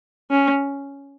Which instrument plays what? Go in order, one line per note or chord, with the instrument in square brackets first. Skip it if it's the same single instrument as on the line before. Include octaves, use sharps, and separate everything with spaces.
[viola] C#4